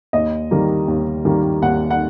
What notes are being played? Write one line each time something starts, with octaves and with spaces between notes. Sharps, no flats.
D#2 D#5
D#3 G3 A#3
D#2
D#3 G3 A#3
D#2 F#5
F#5